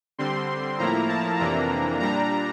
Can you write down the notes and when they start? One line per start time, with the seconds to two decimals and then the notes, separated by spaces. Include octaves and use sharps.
0.18 D3 G3 C4 C6
0.78 A2 F3 A#3 E4 A#5
1.08 A5
1.39 F2 C3 E3 A#3 D4 A#5
2.00 A#2 G3 D4 A#5